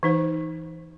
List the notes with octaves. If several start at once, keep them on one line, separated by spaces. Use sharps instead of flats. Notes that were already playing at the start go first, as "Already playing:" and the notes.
E3 D#4 C5